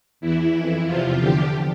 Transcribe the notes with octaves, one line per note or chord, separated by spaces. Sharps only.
E2 E3 E4
F2 E3
E2 C3 F3 F4
E2 D3 F3 G4